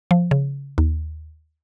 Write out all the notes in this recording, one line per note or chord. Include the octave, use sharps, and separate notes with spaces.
F3
C#3
D#2